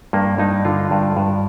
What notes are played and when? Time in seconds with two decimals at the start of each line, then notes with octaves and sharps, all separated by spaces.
0.13 G2 A#3
0.38 G2 D#4
0.65 D3 F4
0.91 G2
1.17 G2